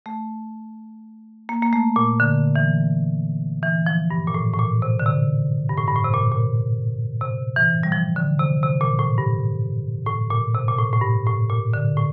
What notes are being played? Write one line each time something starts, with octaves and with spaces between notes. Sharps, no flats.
A3
A#3
A#3
A3
A#2
D3
E3
E3
F3
G2
A#2
A2
A2
A#2
C3
D3
C3
G2
A2
G2
A2
C3
A#2
A#2
C3
E3
G3
F3
D3
C3
C3
A#2
A2
G2
A2
A#2
C3
A#2
A2
A2
G2
A2
A#2
D3
A2